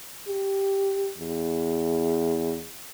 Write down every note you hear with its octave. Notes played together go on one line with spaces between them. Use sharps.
G4
E2